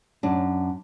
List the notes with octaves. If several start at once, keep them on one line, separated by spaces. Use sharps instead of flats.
F#2 D4